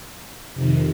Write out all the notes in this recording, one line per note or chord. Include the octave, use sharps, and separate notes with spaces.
F2 C3 D#3